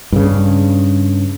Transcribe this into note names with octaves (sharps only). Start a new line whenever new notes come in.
G2 C#3